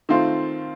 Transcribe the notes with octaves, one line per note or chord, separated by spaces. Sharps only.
D#3 A3 C4 F4